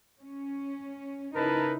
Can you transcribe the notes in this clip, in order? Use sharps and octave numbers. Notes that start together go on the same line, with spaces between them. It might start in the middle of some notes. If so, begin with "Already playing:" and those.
C#4
C#3 D#4 E4 A#4 B4 A5